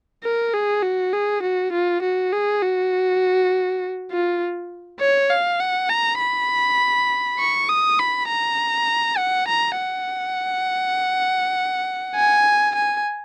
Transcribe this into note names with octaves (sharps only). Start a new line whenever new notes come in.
A#4
G#4
F#4
G#4
F#4
F4
F#4
G#4
F#4
F4
C#5
F5
F#5
A#5
B5
C#6
D#6
B5
A#5
F#5
A#5
F#5
G#5
G#5